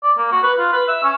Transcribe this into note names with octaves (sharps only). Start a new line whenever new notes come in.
D5
A#3
F#4
B4
F4
B4
E5
C#4